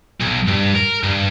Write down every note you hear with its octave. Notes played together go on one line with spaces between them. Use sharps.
B1
G2
A#4
G2